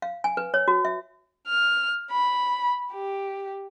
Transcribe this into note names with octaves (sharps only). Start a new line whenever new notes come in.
F5
G#5
B4
C#5
F#4
E5
F6
B5
G4